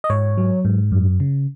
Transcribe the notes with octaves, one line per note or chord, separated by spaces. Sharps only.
D#5
G#2 C#5
F#3
G#2
F#2
C#3